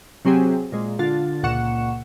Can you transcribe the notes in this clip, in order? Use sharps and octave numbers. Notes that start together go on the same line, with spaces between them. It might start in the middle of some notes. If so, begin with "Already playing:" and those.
C3 F#3 C4 G4 G#4
A#2 G#3
D3 F4 A6
C#2 A#2 F#5 C#6 C#7 E7